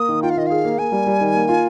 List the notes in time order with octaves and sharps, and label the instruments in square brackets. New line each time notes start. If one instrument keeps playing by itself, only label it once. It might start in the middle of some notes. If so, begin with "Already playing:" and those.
Already playing: [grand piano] A#3 [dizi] D#6
[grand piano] D#3
[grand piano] F4 [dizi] G5
[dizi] F5
[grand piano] D#3 [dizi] D#5
[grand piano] G#4 [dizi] F5
[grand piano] A#3
[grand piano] A#3 [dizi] G#5
[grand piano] G3
G3
D#3
A#3
F4